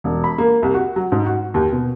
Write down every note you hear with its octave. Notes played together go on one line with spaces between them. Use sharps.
E1
B5
A#3
C2
F#4
F#3
G#2
F#4
D#2
B2